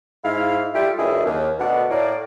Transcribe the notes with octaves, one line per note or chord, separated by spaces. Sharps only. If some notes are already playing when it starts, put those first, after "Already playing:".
G#2 E4 F5
G3 A3 E4 F4 G4
C#2 F#2 D4 E4 G#4 D#5
D#2
D2 B2 D4 F#5
A2 A#3 D5